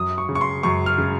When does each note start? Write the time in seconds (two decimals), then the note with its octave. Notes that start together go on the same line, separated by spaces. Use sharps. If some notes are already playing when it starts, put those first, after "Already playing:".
Already playing: F#2 D#6
0.18 C#6
0.29 C#3
0.35 C#6
0.41 C6
0.63 F#2 C#6
0.86 F6
0.98 C#3